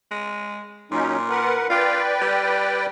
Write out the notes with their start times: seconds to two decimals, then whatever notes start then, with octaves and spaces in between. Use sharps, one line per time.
0.11 G#3
0.92 A#2 F#3 C#4 D#4
1.30 A#4 B4 F#5
1.70 F4 B4 D5 G5
2.22 G3